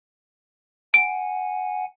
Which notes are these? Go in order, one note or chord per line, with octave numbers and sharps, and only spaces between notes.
F#5 G#5 D7